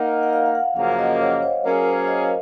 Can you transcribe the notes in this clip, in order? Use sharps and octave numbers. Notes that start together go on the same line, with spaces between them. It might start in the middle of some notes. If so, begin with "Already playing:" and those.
Already playing: A#3 D#4 A#4 F#5
F#5
F#5
F5
F5
F#5
F#2 C#3 F3 A#3 F5
F5
D#5
C#5
C5
F#3 A#3 C#4 G#4 A#4
C5
F5
D#5